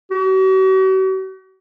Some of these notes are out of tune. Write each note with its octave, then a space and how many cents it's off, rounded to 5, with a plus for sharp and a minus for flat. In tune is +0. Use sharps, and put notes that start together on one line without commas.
F#4 +45